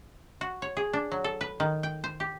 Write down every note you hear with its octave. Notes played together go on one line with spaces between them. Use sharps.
F#4
C#5
G#4
D4
F#3
A4
B4
D#3
G5
C5
G4